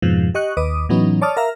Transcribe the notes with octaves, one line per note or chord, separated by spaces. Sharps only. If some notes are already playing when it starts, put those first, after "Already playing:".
F2 G#2 B2 F3
G4 D#5 C#6 F#6
D#2 B4 D#5 D6 D#6
A2 E3 F#3 B3 C#4 D#4
C#5 D5 A5 D6 D#6 F6
A#4 E5 F5 A#5 F6